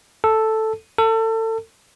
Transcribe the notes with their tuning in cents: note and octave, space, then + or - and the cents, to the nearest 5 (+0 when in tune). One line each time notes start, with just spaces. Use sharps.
A4 +0
A4 +30